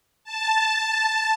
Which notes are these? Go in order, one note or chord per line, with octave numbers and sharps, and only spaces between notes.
A5